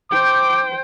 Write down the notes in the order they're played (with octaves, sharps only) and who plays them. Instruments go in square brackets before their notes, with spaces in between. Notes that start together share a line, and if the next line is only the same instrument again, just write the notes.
[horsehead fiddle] C5 G5 [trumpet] D6